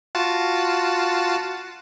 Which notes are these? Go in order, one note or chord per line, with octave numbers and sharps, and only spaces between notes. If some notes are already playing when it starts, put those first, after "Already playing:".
F4 F#4 A5